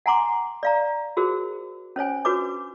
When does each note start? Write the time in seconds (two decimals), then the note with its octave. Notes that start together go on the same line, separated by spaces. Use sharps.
0.06 F#5 G#5 A#5 C6 D6
0.63 D5 F5 A#5
1.17 F#4 G#4 A#4 C5
1.96 C#4 C5 C#5 G#5
2.25 D4 F#4 B4 C#5 D6